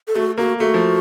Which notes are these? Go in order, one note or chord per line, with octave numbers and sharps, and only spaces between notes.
A4
A3 F#4
A#3 F#4
A3 F#4
F3